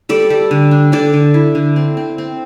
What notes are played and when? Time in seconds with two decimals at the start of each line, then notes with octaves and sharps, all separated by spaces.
0.09 G3 A4 D5
0.30 G3
0.51 D3
0.71 D4
0.92 D3 A4 D5
1.13 D3
1.34 E4
1.55 D3
1.76 C4
1.97 C4
2.18 C4